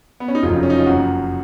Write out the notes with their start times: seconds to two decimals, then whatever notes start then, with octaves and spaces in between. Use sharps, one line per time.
0.20 B3
0.28 C#4
0.35 D#4
0.43 F1 F2 C#3 F#3 F4
0.63 C#4
0.70 D#4
0.78 F4
0.86 F#1 F#2 F3 F#4